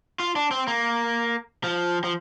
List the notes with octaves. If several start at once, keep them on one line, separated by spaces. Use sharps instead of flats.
F4
D4
C4
A#3
F3
F3